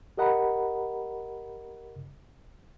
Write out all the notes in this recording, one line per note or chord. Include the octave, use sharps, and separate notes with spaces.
G4 A#4 D#5 F#5 A#5 B5